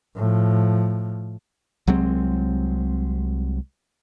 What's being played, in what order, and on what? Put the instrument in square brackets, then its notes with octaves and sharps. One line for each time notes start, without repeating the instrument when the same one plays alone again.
[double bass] A2 F3
[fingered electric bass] C2 F#3 G#3 C4